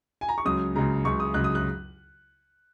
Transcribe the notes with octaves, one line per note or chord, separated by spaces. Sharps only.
G#5
A#5
C#6
C#2 C#3 F#3 D#6
C#2 C#3 F#3 A#5
C#2 C#3 F#3 C#6
D#6
C#2 C#3 F#3 F#6
D#6
F#6